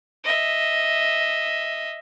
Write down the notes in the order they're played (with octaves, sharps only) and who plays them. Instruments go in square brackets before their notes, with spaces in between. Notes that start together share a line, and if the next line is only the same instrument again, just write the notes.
[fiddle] D#5 E5